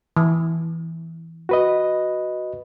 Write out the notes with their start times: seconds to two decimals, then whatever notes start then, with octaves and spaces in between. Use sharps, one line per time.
0.17 E3
1.49 F#4 B4 D#5